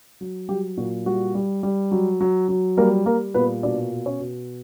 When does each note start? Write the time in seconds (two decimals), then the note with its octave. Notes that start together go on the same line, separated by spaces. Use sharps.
0.21 F#3
0.49 F#3 G3 G4
0.77 A#2 F#4
1.06 G3 F#4
1.35 G3
1.63 G3
1.91 F#3
2.21 F#3
2.49 F#3
2.77 G3 A#3 A#4
3.06 G3 A#3 A#4
3.34 A#2 B3 B4
3.63 B2 D4 D5
3.92 B2
4.06 C#4 C#5
4.20 B2